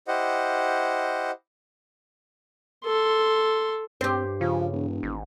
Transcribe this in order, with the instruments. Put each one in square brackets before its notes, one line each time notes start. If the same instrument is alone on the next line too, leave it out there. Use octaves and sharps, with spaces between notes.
[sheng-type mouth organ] E4 G4 C5 D#5 F#5
[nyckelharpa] A4 C6
[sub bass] G2 [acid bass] C4 [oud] G4 C5
[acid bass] C#3 [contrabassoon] F3
[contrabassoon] E1
[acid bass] G#1